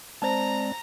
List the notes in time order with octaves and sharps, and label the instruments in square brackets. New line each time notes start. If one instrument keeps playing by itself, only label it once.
[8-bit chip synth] G#3 C4 D5 [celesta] C5 A5 [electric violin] A#5 A#6